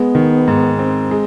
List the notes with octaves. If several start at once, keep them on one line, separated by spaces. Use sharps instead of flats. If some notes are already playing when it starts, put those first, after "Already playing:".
Already playing: G#3 B3
D#3
G#2
C4
G#3